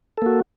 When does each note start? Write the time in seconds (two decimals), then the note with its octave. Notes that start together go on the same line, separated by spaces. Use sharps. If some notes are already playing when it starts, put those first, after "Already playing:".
0.18 A4
0.22 A#3
0.26 F#4